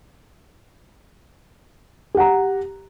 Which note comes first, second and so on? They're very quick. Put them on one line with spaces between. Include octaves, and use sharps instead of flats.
G4 F#5 A#5